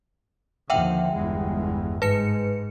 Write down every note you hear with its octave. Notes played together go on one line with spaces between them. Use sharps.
D#2 D3 F3 E5 F#5 G5
G1 E2 G#3
G#2 B4 C#7